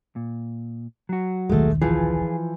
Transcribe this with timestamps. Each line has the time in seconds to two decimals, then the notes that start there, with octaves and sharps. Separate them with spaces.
0.16 A#2
1.09 F#3 F#4
1.49 D#1 B1 D#3 G#3 A3
1.82 E3 F3 F4 G#4